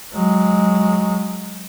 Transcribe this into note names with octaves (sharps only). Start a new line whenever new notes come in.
F#3 G#3